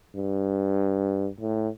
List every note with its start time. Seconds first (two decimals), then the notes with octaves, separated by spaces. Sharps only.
0.15 G2
1.40 A2